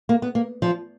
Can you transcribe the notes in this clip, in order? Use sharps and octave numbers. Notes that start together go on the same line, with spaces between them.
A#3
B3
A#3
F3